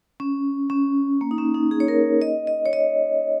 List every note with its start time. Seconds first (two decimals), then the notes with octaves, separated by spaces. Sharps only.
0.20 C#4
0.70 C#4
1.21 A#3
1.31 D#4
1.38 C#4
1.54 D#4
1.71 G#4
1.80 C#5
1.88 A#4
2.22 D#5
2.47 D#5
2.66 C#5
2.73 D#5